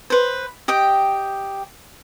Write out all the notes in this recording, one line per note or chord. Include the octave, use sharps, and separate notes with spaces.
B4 C5
G4 D#5 G5